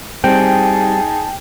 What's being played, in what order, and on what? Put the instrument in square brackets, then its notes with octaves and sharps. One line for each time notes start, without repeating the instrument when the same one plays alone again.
[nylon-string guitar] G3 C4 [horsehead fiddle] D#4 G#4 [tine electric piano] G5 [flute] A5